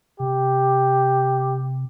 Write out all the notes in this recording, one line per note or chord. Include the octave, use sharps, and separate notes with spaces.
C3 G4